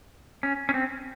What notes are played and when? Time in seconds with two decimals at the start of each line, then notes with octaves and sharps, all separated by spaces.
0.43 C#4
0.69 C#4
0.74 C4